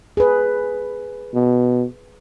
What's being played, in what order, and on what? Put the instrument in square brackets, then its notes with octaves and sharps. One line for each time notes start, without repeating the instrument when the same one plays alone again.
[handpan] G#4 B4
[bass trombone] B2